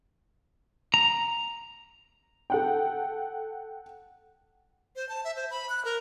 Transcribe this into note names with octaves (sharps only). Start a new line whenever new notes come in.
A#5
A4 F#5 G5
C5
A5
E5
C5
B5
F#6
A#4